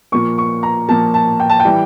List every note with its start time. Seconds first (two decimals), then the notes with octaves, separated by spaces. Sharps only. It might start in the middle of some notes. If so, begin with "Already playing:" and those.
0.12 A#2 F3 A#3 C#6
0.38 C#6
0.63 A#5
0.88 A#2 F3 A#3 A5
1.14 A5
1.40 G5
1.50 A5
1.60 G5
1.65 E3 G3